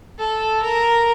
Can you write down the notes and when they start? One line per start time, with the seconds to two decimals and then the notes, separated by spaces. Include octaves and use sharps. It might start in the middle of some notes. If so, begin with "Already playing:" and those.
0.18 A4
0.62 A#4